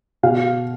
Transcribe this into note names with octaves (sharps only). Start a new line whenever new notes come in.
B2 F5